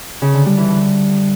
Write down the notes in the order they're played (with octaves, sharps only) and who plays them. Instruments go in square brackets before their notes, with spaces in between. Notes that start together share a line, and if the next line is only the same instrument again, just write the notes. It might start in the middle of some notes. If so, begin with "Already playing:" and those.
[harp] C#3
D3
G3
E3
D3